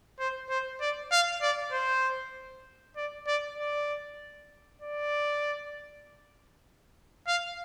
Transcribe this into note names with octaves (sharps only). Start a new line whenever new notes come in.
C5
C5
D5
F5
D5
C5
D5
D5
D5
D5
F5